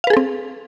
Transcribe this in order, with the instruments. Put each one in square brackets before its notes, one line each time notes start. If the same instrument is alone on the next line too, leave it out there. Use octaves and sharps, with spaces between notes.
[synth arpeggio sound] F5
B4
G#4
A4
C4